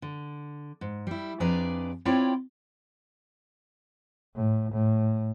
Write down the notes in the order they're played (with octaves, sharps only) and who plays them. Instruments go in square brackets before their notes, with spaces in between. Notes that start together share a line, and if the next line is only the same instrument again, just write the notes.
[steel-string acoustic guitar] D3
G#2
G3 E4
F2 D4 G#4 B4 D5 A#5
C4 E4 F4 C#5 D5 G5
[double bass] A2
A2